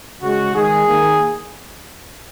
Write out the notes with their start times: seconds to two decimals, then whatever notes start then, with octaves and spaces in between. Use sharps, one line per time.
0.22 C#3 G#3 F#4
0.54 D#3 G#3 G#4
0.86 D#3 A#3